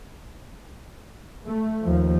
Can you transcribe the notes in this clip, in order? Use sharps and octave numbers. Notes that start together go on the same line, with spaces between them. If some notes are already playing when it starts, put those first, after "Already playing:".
A3
D#2 F3